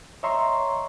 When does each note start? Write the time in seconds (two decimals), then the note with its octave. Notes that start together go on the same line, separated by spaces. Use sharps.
0.23 C#5 D#5 E5 A#5 C6 C#6